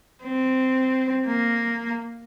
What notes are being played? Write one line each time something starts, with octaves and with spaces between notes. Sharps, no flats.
C4
A#3